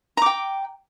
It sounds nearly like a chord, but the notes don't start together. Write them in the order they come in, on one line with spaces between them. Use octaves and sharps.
A#5 D6 G5